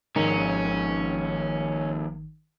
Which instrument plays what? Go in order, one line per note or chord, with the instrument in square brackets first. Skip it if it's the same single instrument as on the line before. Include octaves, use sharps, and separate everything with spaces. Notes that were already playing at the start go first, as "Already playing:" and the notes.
[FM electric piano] G#1 D#3 [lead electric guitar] D#2 G#3 [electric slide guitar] F3 A#5 [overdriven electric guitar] C#4